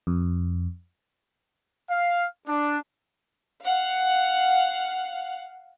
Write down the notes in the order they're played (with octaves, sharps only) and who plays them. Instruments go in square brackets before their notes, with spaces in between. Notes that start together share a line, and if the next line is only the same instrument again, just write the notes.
[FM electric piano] F2
[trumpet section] F5
D4
[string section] F5 F#5